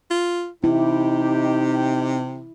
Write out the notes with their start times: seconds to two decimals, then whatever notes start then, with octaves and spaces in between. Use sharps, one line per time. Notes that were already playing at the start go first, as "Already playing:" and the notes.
0.10 F4
0.64 C3 D#4 E4 G4